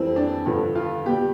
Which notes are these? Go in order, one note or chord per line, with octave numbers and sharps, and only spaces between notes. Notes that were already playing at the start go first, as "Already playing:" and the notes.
Already playing: F2 E3 G3 C4
D4
G2 D3 F3
F4
B2 G3 G4